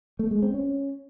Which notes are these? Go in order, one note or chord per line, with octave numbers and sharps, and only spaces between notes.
A3
G#3
C4
C#4